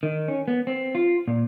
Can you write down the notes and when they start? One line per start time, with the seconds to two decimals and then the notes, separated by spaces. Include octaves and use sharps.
0.03 D#3
0.28 C#4
0.48 B3
0.67 C4
0.95 F4
1.28 A#2